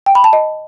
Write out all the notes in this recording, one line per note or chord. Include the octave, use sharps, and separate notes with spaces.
G5
B5
A5
D#5